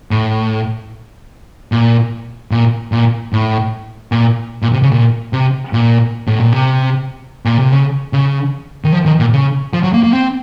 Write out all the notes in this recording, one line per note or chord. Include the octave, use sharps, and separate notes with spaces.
A2
A#2
A#2
A#2
A2
A#2
A#2
C3
C#3
A#2
C3
A#2
A2
A#2
C3
A#2
C3
C#3
C#3
D#3
F3
D#3
A#2
C#3
F3
F#3
A#3
A#3
C4